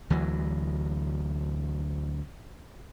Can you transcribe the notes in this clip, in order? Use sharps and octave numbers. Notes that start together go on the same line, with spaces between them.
D2 E3 F#3